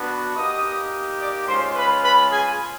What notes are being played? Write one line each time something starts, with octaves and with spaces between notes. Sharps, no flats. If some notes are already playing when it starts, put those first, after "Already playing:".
Already playing: B3 D4 F#4
A#3 D#4 G4 D#5 D#6
D5 D6
G#3 C#4 F4 C5 C6
B4 B5
B4 B5
G#4 G#5